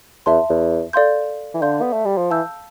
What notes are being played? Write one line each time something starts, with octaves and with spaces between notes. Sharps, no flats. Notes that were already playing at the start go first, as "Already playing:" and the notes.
E2 E5 A5 C6
E2
A4 D5 F5 C6 G6
E3
D3 A4 D5 F5 C6 G6
B3
A3
G3
F3
E3 F5 A5 E6 G6